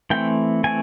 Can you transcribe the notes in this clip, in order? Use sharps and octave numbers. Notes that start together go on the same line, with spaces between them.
E3 A3 C4 G5
E3 A3 C4 G#5